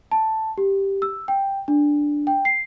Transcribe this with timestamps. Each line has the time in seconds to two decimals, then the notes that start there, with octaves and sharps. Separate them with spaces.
0.12 A5
0.58 G4
1.02 E6
1.28 G5
1.68 D4
2.27 G5
2.45 C7